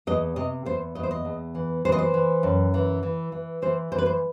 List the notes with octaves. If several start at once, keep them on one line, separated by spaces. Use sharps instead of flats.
E2 D#5
C3 D#5
E2 C5
E2 D#5
C5
D#5
E2
E3
E3 C5
D#5
C5
E3
F#2
E3
E3
E3
E3 C5
E3 C5
B4
C5